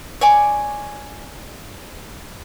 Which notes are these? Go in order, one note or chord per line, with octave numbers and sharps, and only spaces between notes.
C#5 D5 G#5 D6